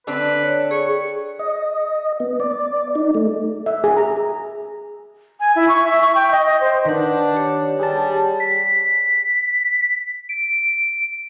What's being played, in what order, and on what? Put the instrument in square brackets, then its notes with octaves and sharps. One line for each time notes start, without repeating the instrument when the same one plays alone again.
[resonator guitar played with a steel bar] D3 C4 D4 [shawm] B4
[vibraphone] C#5
[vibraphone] G#4 [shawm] C#6
[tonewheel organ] D#5
B3
D5
D#4
A3
[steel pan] E5
G#4
A#5
[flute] G#5
E4
C#6
E5
C#6
G5
D#5
D#5
C5
[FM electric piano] D#3 [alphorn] D4 [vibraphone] B4 F#5
[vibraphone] G4 C#5
[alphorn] G3 [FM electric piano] G#4 A5
[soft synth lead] B6
D7